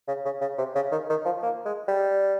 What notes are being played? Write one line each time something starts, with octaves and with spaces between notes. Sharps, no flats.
C#3
C#3
C#3
C3
C#3
D#3
D#3
F3
A#3
G#3
G3